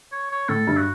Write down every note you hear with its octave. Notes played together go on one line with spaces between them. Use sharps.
C#5
C#5
A2 A4
G2
F#4